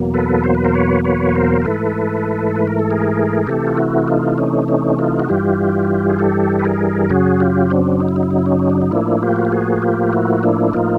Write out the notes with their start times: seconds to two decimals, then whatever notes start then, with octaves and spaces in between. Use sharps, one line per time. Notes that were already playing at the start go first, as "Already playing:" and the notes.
Already playing: E2 B2 F#3 A#3
0.14 A4 B4
0.44 C5
0.55 B4
0.64 A#4 C5
0.74 B4 C#5
1.04 B4 C#5
1.35 A#4 C5
1.62 C5
1.65 G#2 E3 A3 A4 B4
2.55 B4
2.67 A#4
2.79 A4
2.91 G#4 A#4
3.47 C3 E3 A3 G4 A4
3.67 F4
3.77 E4 F#4
4.08 D#4 F4
4.38 C#4 D#4
4.68 C#4 D#4
4.99 D#4 F4
5.20 F#4
5.29 G2 E3 G3 F4 G4
6.09 G#4
6.19 G4 A4
6.59 B4
6.65 G#4 A#4
7.10 F#2 C#3 F#3 F#4 G#4
7.40 F4 G4
7.70 C4 D4
8.00 D#4
8.09 E4
8.16 D#4
8.23 E4
8.31 D#4
8.39 E4
8.46 C#4 D#4
8.59 C#4
8.70 D4
8.82 D#4
8.91 A2 F3 A#3 D4 E4
9.22 F4 G4
9.36 F#4
9.45 G4
9.52 F#4 G#4
9.82 F4 G4
10.13 E4 F#4
10.43 D4 E4
10.73 A2 F3 A#3 D#4 F4